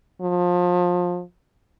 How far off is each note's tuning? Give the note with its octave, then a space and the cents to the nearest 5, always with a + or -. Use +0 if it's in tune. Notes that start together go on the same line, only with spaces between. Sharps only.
F3 +25